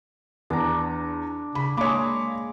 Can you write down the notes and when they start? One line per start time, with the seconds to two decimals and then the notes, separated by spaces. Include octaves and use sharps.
0.50 E2 D4 A#5
1.55 C#3 B5
1.77 G#3 A#3 C#5 B5 D6